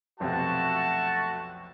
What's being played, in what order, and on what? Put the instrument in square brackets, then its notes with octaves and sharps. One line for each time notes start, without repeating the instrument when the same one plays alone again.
[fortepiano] B1 F2 C3 [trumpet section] A3 F#4 [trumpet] A5